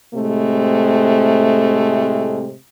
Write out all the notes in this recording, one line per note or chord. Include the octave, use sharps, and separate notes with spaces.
A2 C3 G#3 A3 C4